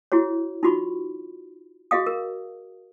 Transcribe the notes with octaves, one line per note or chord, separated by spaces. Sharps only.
E4 F#4 G#4 C#5
D#4 F4 F#4 B5 C#6
F#4 G#4 D#5 F5 D#6
A#4